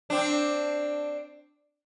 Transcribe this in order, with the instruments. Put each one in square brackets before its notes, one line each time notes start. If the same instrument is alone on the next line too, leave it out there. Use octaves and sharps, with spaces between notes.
[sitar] C4 D4